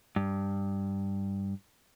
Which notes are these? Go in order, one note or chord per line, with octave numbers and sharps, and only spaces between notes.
G2